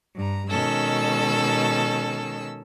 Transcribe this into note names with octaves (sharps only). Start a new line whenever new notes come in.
G2 A#5
B2 D#3 G#3 C#4 A4 E6